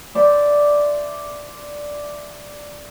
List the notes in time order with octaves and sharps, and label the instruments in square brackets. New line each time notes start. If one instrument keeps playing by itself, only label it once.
[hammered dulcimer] C5 D5 E5